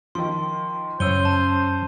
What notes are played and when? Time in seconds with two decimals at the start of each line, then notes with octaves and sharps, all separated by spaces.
0.15 D#3 F3 C6
1.00 F#2 C#3 C5 C#5 E6 D#7 G7
1.25 A5